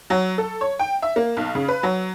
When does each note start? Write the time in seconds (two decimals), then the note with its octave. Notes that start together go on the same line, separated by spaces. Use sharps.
0.10 F#3
0.38 A4
0.61 C#5
0.79 G5
1.02 E5
1.16 A#3
1.37 B1
1.55 C#3
1.68 B4
1.83 F#3